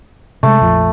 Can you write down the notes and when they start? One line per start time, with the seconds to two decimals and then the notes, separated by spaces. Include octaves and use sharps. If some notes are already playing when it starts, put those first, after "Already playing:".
0.43 C3 G#3 A3
0.61 A#1 F2 F3